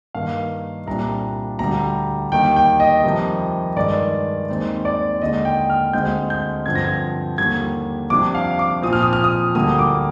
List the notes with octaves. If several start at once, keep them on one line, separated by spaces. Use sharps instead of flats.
G2 D#3 A#3 F5
C2 A#2 G3 D4 A#5
D2 D3 G3 A#5
D#2 D#3 G3 G5
G5
D#5
F2 C3 D#3 G3
G2 D#3 G#3 D#4 D5
D#2 D#3 G#3 C4 D#4
D5
D#2 D3 G#3 D#5
G5
F6
D2 D3 G#3 C4 G6
G6
G2 D3 F3 C4 G#6
A#6
G#6
D#2 D3 G3 A#3 G#6
F2 C3 G3 D4 D6
F5
D6
A#2 F3 C4 D#6
F6
D#6
F6
D#6
D2 D3 G3 A#3 D#6
D6